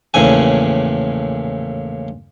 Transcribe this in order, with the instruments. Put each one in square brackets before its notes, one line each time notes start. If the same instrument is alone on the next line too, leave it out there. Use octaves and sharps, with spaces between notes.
[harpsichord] A#1 E2 A2 C#3 G#5